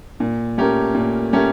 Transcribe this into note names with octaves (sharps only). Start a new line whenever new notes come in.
A#2
A3 C#4 G4 A#4
A#2
A3 C#4 G4 A#4